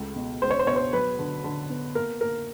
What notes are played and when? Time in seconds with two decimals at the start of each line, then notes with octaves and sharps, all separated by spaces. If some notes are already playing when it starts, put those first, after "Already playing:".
Already playing: C#2 A3
0.16 B2
0.42 C#2 C5
0.50 C#5
0.59 C5
0.67 B2 C#5
0.76 C5
0.93 F#3 B4
1.19 D3
1.44 D3
1.70 B3
1.95 A#3 A#4
2.21 A#3 A#4